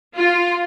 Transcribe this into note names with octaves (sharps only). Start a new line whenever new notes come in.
F4